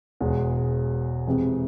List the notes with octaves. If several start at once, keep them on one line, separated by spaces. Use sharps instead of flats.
E1 E2 B2 G#3
F2 C3 E3 G#3